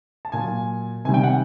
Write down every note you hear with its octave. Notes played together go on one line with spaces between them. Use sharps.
A5
A#2 F#3 G#5
C3 D#3 G3 G#5
G5
F#5